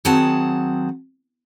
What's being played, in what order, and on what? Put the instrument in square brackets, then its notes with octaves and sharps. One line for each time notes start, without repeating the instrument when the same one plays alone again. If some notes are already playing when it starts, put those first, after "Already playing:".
[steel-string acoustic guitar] D#3 F#3 C4 G#4 F#5 A5